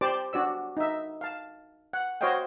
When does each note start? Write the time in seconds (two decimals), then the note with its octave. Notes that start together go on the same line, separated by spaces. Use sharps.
0.01 G4 C5 D5 A5 D6
0.33 D4 F#4 D5 E6
0.77 D#4 E5
1.21 F5 A5
1.93 F#5
2.21 F#4 C5 C#5 D#5 F5 G5